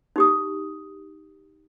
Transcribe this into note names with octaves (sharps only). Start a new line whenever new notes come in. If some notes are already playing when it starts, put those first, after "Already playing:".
D#4 G4 D#6